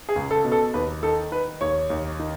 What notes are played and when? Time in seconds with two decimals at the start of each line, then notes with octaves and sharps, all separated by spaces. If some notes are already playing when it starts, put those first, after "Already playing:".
0.09 G#4
0.16 C#2
0.31 A4
0.45 B2
0.52 A4
0.74 D#2 B4
1.03 D#3 A4
1.32 D#3 B4
1.61 D#2 C#5
1.90 D#2
2.20 D#3